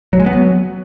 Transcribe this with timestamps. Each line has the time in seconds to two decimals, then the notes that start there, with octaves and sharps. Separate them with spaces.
0.13 F#3
0.20 G#3
0.26 B3
0.33 F#3